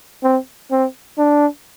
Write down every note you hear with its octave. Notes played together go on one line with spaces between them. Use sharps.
C4
C4
D4